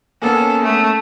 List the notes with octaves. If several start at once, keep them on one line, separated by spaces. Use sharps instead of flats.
A#3 B3 C#4 A4
A3